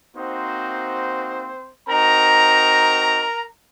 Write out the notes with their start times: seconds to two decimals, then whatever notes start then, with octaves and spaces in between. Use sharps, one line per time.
0.14 A#3 C4 D#4 F#4 C5
1.88 C4 D#4 F#4 A#4 A#5